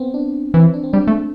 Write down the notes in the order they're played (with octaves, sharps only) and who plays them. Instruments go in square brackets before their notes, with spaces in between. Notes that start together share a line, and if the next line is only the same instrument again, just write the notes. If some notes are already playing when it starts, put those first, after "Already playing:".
Already playing: [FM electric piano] B3 C4
D4
[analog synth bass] E3 [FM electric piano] C4
[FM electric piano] D4
C4
[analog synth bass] G3 [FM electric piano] D4
[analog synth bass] A3